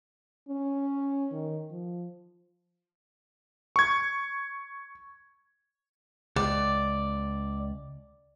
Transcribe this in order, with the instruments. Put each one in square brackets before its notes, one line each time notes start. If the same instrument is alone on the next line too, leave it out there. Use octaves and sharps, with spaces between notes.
[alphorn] C#4
D#3
F3
[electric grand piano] C#6 G#6
[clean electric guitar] C#2 [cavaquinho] D5